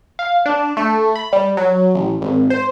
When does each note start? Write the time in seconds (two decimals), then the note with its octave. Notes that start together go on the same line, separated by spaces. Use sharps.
0.19 F5
0.46 D4
0.77 A3
1.16 B5
1.33 G3
1.57 F#3
1.95 A1
2.21 G#1
2.50 C5